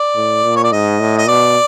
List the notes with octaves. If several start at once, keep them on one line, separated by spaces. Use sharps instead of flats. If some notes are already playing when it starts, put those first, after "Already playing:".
Already playing: D5
A2
A#2
C#5
D5
G#2 D#5
A2
D#5
B2 D5